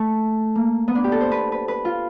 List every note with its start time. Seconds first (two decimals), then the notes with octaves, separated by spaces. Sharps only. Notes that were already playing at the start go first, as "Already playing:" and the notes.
Already playing: A3
0.55 A#3
0.88 B3
0.95 D4
1.04 G4
1.12 A4
1.21 C5
1.32 B4
1.52 B4
1.68 B4
1.85 F4